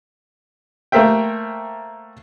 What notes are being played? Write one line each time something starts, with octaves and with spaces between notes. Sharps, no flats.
A3 A#3 A#4 C5 E5 G5